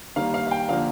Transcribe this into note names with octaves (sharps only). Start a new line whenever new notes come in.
D#3 G3 A#3 F5
F5
F5
G5
D3 F3 A#3 F5